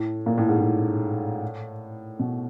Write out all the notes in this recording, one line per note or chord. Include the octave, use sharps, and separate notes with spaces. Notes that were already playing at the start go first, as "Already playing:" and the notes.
Already playing: A2
A#2
A2
G#2
A2
B2